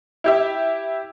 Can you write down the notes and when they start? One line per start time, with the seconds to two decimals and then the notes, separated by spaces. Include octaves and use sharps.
0.24 E4 G4 E5